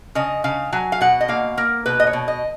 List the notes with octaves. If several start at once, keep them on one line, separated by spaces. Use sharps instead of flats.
C#3 D#5
C#3 F5
F#3 G#5
F5
B2 F#5
D#5
A#3 F5
A#3 A#4
B2 B4
D#5
C#5
B2
D#5